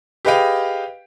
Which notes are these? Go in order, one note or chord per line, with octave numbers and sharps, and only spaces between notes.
G4 G#4 B4 D#5 F5 G5